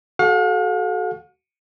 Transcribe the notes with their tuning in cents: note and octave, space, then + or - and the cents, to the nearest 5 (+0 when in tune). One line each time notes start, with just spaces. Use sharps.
F#4 +20 A4 -25 F5 +45